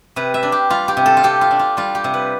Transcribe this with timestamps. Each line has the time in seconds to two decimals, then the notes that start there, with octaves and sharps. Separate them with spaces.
0.16 C3 B4
0.34 E5
0.43 D4
0.52 G4
0.70 G3 F4
0.88 G4
0.97 C3
1.06 A4
1.17 F4
1.23 C3 G4
1.41 F4
1.51 D4
1.59 F4
1.77 G3 F4
1.95 G4
2.04 C3
2.14 B4